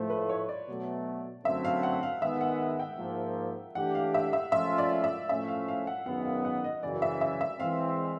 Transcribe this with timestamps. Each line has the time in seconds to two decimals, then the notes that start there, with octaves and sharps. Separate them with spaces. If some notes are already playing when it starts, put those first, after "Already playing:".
Already playing: A2 F3 A3 C5
0.10 B4
0.29 C#5
0.49 D5
0.68 B2 F#3 A3
1.45 F#2 D3 F#3 A3 C4 E5
1.65 F5
1.83 F#5
2.03 F5
2.22 D#3 G#3 B3 E5
2.41 F#5
2.79 G5
2.99 G#2 F3 A#3
3.75 E3 A3 D4 G4 F#5
3.95 F5
4.14 E5
4.33 E5
4.52 F3 A3 C#4 F4 E5
4.78 D5
5.04 E5
5.29 A2 F3 A3 C#4 E5
5.48 F5
5.68 F5
5.87 F#5
6.06 F#2 D#3 G#3 B3 F#5
6.25 F5
6.45 F#5
6.64 D#5
6.83 F#2 C#3 E3 D5
7.02 E5
7.21 E5
7.41 E5
7.60 E3 G#3 C4 F5